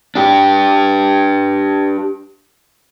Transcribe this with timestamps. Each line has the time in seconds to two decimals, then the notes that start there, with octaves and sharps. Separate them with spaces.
0.16 D4 G4